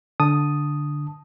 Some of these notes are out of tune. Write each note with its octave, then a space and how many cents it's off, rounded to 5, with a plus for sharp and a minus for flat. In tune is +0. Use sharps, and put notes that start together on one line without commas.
D3 +0 A5 +0 D#6 +0